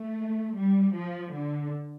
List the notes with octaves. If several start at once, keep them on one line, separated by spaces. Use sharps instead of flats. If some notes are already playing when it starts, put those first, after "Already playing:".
Already playing: A3
G3
F3
D3